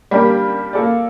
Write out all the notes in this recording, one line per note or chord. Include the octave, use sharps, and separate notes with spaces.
G3 A#3 D4 G4 A#4
A#3 F4 A4 D5